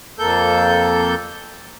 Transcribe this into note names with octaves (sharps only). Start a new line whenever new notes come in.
F2 A#3 A4 G6